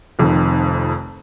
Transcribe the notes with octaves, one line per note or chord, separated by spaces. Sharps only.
F1 F2 D#3